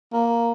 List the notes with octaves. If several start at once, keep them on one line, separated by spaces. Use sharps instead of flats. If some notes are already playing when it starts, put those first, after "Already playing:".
A#3